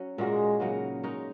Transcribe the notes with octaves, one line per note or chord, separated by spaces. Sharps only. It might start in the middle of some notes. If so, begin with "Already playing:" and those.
Already playing: F#3 C#4
A#2 G#3 A#3 F#4 A#4
C#3 F#3 A#3 D#4
G#3 D#4 A#4 C#5